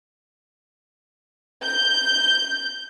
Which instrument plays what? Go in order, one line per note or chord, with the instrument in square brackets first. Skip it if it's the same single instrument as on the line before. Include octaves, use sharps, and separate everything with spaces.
[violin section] G6